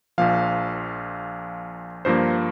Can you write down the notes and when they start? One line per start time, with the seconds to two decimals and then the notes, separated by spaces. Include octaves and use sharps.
0.18 A#1 A#2 F3 F5
2.05 G2 F3 A#3 C5